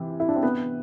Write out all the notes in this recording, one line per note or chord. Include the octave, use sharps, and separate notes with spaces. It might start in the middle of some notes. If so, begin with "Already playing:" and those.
Already playing: C3 E3
E4
D4
C4
B3